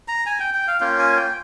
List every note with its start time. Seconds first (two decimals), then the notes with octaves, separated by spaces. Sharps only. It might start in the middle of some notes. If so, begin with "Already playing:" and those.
0.08 A#5
0.26 G#5
0.40 G5
0.54 G5
0.68 F5
0.80 A#3 C#4 F4 G5
0.99 G#5
1.17 G5